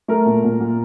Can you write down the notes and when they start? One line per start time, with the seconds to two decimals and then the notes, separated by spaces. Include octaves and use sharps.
0.08 A3 A#4
0.26 A#2
0.44 A#2
0.60 A#2